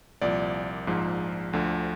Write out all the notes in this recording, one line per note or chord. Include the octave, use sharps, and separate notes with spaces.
C2 A#2 F3 D5
A#1 G#2 F3
D2 D3 F3